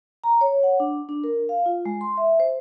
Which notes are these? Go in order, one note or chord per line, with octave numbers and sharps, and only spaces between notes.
A#5
C#5
F#5
D4
D4
A#4
F5
F4
G#3
C6
E5
C5